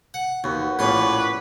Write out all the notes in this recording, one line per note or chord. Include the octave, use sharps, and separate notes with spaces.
F#5
D#2 F#4 B4
A#1 A2 C#4 B4 D5 C6